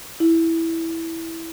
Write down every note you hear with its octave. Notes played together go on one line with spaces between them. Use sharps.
E4